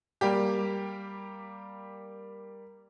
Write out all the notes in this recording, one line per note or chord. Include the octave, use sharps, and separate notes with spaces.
G3 A#3 G4